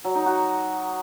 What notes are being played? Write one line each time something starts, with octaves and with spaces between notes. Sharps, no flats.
F#3
D#4
F#4